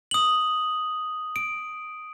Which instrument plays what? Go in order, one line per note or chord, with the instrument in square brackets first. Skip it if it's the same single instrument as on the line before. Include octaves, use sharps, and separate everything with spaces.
[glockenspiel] D#6 F#7
D7